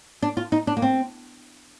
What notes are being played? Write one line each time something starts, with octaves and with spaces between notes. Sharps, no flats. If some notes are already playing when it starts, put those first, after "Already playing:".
D4
F4
D#4
D4
A#3
C4